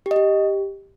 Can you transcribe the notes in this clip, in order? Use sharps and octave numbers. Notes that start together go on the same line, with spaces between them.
G4
D#5
G4